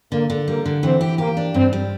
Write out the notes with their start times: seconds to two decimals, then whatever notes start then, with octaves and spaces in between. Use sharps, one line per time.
0.12 D3 A#3
0.30 D3
0.48 G3 A#3
0.66 D3
0.83 E3 C4
1.01 G4
1.18 A#3 G4
1.37 D4
1.54 G2 C4
1.73 G3